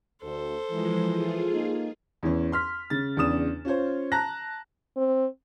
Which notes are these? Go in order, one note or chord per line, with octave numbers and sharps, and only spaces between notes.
D2 A4 C5
E3 F3 G#3
F4 G#4
A#3 D#4
E2 E3 C#4
C6 F6 B6
C#3 A6
E2 C#3 D4 D#6 E7
C#4 F4 C5 C#5
A5 A#5 F#6 A#6
C4